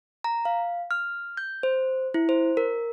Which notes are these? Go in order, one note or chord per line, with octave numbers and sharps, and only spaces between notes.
A#5
F5
F6
G6
C5
E4
C5
A#4